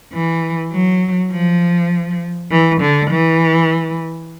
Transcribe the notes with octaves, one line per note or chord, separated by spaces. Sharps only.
E3
F#3
F3
E3
D3
E3